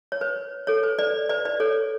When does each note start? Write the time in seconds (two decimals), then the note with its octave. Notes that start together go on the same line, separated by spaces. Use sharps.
0.12 C#5
0.21 B4
0.67 A4 C#5
0.83 B4
0.99 B4 D5
1.29 B4 D5
1.45 B4 D5
1.60 A4 C#5